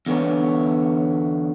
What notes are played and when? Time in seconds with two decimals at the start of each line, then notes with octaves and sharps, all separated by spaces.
0.06 E2 D3 B3 C#5